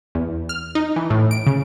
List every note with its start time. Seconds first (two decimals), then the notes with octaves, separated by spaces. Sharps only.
0.15 E2
0.49 F6
0.75 D#4
0.96 E3
1.10 A2
1.31 D7
1.47 C#3